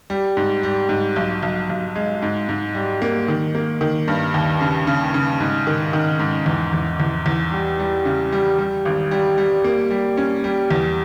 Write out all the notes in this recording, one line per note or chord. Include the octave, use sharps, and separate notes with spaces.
G3
G#2
G3
G#2
B1
B1
B1
G#3
G#2
G#2
G3
A#3
D#3
A#3
D#3
G2
D#2
C#3
C#3
C#3
G#2
D#3
D#3
G#2
E2
E2
E2
E2
G3
G3
C#3
G3
G3
G#1
G3
G3
A#3
G3
C#4
G3
E2